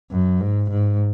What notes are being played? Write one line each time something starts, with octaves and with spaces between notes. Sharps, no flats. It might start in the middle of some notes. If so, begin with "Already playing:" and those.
F#2
G#2
G#2